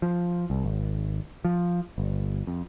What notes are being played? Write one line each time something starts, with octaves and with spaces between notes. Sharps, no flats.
F3
C2
G#1
F3
G1
F2